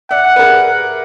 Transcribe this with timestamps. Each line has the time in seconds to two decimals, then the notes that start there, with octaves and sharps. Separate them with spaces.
0.11 D5 E5 F#5
0.36 B4
0.39 G#4 A#4